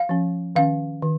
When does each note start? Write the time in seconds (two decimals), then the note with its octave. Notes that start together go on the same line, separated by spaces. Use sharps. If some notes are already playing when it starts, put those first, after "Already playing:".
Already playing: F5
0.09 F3 C#4
0.56 D#3 C#4 F5
1.02 D#3